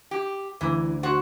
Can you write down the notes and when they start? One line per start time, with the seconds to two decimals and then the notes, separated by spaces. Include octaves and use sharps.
0.11 G4
0.61 D2 E3
1.03 F#4 C5